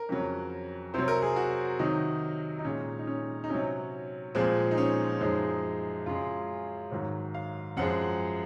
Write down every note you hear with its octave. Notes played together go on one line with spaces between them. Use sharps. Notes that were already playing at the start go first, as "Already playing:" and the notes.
Already playing: A#4
F2 C#3 F#3
C3 F#3 C5
A#4
G#4
F#4
C3 D#3 F#3 D#4
D#4
A#2 G#3 C#4
D#4
C#4
D#4
C3 F#3 C#4
A#2 F3 G#3 C4
D#4
C#4
F#2 F3 G#3 D#4
F#2 C#3 G#3 F4
G#2 D#3 F#3
F5
F#2 F3 G#3 F#5